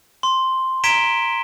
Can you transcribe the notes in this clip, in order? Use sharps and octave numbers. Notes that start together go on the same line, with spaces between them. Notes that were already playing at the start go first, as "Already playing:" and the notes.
C6
A#5 G#6 B6 D7 E7 G7